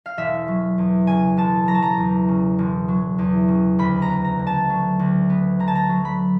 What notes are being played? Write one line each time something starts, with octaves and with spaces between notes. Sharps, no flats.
F5
E1 E5
F#3
E2
C#3 G#5
E1 A5
F#3 A#5
A5
A#5
E2
C#3
E1
F#3
E2
C#3
D2 B5
A#5
B3
A#5
D3
A5
F#3
D2
B3
D3 A#5
A5
A#5
F#3
B5